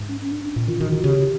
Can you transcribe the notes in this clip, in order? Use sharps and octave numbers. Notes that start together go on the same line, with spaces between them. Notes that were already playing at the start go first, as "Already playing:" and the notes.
Already playing: G#2
C#4
C#4
D4
D4
A#2
D#3 F4
D#3 F#4
D#3 F#4
C#3 G4